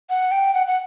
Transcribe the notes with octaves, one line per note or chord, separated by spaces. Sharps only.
F#5
G5
F#5
F#5